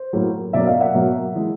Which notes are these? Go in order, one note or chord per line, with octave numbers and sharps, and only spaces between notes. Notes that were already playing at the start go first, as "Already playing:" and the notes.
Already playing: C5
A2 F#3 A#3
B2 F#3 A#3 D5 E5
D#5 F5
E5 F#5
B2 F#3 A#3
E3 G#3